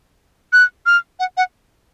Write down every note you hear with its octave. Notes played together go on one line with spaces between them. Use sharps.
F#6
F6
F#5
F#5